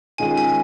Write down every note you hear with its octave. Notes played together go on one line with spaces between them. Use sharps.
D#3 G#3 C#4 F4 G#4 G#5
G#5